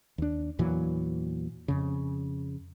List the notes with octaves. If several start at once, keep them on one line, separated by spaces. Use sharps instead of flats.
D#2 D4
E2 A#2 E3 F#3
F2 C#3